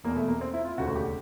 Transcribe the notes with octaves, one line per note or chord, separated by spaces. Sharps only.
F1 E2 B2 A#3
A3
A#3
C4
E4
F4
E1 D2 C#3 F#4
G4